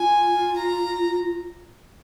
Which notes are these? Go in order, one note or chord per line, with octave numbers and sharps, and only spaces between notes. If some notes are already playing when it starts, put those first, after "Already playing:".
Already playing: F4 G#5
A#5